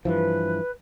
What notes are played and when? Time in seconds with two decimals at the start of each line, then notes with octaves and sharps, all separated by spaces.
0.05 G2 E3 F3 B4